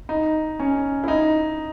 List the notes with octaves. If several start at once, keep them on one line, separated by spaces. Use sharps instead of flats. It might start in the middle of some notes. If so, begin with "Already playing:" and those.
D#4
C#4
E4
D#4